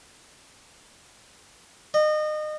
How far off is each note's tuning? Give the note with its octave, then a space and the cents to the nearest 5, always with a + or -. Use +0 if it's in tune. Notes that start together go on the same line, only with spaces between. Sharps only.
D#5 -30